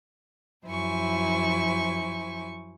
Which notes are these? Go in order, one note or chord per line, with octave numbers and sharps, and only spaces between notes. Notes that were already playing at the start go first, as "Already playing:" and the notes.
F#2 F3 E4 C5 G#5 C#6